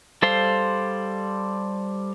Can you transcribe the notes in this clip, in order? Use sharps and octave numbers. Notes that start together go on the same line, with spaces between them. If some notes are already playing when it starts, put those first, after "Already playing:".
G3 A4 C5 F5 C6